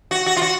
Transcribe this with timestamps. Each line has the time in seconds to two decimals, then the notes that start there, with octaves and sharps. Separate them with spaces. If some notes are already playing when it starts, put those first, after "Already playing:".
0.11 F#4
0.26 F#4
0.37 F4
0.42 F#4